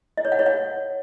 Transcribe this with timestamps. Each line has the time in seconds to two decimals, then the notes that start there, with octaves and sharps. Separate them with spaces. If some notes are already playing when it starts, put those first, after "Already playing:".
0.17 D#5
0.25 C#5
0.32 F#5
0.39 C#5
0.46 F#5